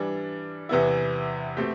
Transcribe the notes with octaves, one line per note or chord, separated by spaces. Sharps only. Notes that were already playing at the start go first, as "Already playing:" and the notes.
Already playing: E3 G3 D4
E2 C3 E3 B3 E4
B2 A3 C4 G4